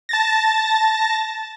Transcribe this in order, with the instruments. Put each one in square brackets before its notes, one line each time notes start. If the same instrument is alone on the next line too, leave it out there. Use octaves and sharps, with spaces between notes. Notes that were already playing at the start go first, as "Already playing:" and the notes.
[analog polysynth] A5 A6 A#6